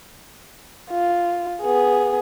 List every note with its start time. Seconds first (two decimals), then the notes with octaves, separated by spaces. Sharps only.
0.90 F4
1.61 B3 G#4